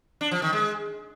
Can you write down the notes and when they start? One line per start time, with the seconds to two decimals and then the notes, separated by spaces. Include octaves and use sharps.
0.21 D4
0.31 F3
0.42 D#3
0.53 G#3